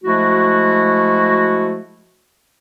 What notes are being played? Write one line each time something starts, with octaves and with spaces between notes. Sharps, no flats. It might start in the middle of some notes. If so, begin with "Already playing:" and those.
F3 G#3 A3 E4 F#4